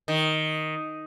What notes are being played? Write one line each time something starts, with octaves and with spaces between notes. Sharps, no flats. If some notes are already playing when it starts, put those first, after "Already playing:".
D#3